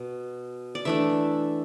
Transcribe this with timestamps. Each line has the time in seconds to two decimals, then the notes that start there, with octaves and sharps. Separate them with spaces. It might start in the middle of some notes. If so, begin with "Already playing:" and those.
Already playing: B2
0.75 D5
0.85 E3 A3 D4 E5